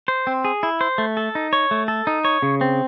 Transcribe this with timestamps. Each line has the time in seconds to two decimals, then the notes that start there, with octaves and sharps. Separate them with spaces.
0.08 C5
0.27 C4
0.45 G#4
0.63 E4
0.81 C5
0.98 A3
1.17 A4
1.35 D#4
1.53 C#5
1.71 A3
1.88 A4
2.07 D#4
2.25 C#5
2.43 C#3
2.61 C4